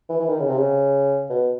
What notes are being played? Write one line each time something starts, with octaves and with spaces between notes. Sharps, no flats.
E3
E3
D#3
C#3
C3
C#3
B2